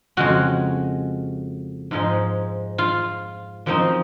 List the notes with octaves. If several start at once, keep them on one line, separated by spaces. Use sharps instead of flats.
F2 C#3 G#3 C#4 F#4
G#2 F3 G#3 D#4
F4
F#2 F3 C4 D#4